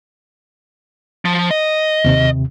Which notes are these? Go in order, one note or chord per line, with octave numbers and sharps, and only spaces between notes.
F3
D#5
D#2 C3